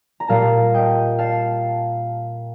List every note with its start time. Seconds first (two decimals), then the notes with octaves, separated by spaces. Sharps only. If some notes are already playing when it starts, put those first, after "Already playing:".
0.20 A#5
0.28 A#2 G3 F5 A5
0.74 D#5 G5
1.19 F5 A5